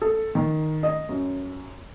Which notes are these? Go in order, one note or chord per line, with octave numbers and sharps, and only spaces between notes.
A4
D#3
D#5
F#2